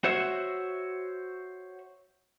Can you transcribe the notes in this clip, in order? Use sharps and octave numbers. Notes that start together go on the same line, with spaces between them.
F#4 C5 C#5 E5